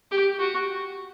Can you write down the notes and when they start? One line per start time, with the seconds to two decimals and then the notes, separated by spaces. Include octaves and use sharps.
0.11 G4
0.39 F#4